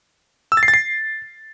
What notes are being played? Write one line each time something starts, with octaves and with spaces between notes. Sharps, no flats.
E6
A6
C7
A6
C7